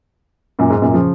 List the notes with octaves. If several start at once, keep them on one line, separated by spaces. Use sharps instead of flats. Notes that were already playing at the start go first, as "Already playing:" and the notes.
F#2 A#2
G#2
F#2 A#2
C#3 F3